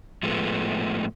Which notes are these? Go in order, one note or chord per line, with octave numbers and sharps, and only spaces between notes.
A2 F3 G#3 A3 B3